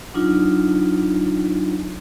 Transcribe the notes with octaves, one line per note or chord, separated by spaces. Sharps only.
F#3 D4 D#4 F4